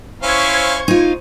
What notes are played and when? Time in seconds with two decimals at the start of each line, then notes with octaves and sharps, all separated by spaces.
0.23 C#4 E4 C5 F5 C#6 G#6
0.88 D#4 F4